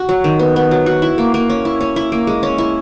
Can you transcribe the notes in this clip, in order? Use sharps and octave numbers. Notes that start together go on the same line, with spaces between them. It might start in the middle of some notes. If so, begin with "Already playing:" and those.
Already playing: F#4
F#3
D#3
B3
B3
F#3
F#4
E4
A#3
A#3
C#4
E4
C#4
E4
A#3
G#3
C#4
E4